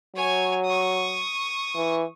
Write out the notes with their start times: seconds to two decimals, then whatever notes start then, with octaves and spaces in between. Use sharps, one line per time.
0.16 F#3 C#5 G#5
0.66 C#6 D#6
1.76 E3